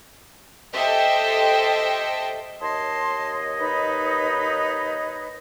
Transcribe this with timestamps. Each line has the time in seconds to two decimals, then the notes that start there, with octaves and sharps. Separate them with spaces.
0.74 G4 A4 C5 D#5 E5 G5
2.61 D#2 C#5 D#5 A5 C6
3.59 D#4 B4 B5